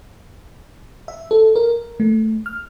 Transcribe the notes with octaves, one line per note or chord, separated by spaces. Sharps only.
E5
A4
A#4
A3
F6